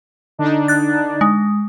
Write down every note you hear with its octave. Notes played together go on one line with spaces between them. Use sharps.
D3 D4 D#4
F#6 A6
G#3